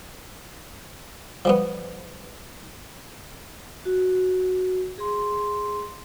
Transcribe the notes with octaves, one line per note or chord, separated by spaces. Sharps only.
F3 G3 B3
F#4
G#4 C6